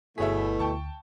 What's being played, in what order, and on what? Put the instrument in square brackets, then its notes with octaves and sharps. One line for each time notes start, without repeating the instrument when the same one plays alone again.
[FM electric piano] G1 B6 [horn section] B2 A3 [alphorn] E4 [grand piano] G#4 C#5 E5
[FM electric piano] D2 [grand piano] G5 A5 C#6